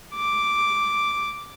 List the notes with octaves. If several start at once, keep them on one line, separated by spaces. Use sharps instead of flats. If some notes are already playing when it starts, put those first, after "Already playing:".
D6